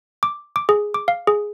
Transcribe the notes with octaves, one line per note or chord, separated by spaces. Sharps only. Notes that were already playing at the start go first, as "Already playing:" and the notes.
D6
D6
G#4
D6
F5
G#4